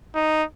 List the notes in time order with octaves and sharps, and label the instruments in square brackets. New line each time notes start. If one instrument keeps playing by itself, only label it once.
[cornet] D#4